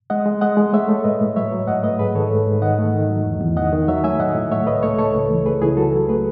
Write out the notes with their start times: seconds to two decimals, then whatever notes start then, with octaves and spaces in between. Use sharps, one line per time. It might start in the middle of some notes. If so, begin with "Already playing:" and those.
0.10 G#3 D#5 F#5
0.26 G#3
0.41 G#3 D#5 F#5
0.57 G#3
0.73 A3 C#5 E5
0.88 A3
1.04 A2 B4 D#5
1.21 A2
1.36 F#3 C#5 E5
1.52 F#3
1.67 G#2 D#5 F#5
1.83 A3 B4 D#5
1.99 G#2 G#4 B4
2.15 D#3 A4 C#5
2.31 G#2
2.47 G#2
2.62 D#3 D#5 F#5
2.79 A3
2.94 D#3
3.09 F#3
3.25 E2
3.41 E2
3.57 D#3 D#5 F#5
3.73 D#3
3.88 F#3 C#5 E5
4.04 A3 E5 G#5
4.19 A2 D#5 F#5
4.35 A2
4.52 A3 C#5 E5
4.67 C#2 B4 D#5
4.83 A3 A4 C#5
4.98 A3 A4 C#5
5.14 C#2
5.31 E3
5.46 C#2 G#4 B4
5.62 C#2 E4 G#4
5.77 F#3 F#4 A4
5.93 F#3
6.09 A3 G#4 B4